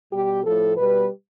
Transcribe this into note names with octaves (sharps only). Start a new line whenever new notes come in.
B2 G3 G4
A2 F3 A4
B2 G3 B4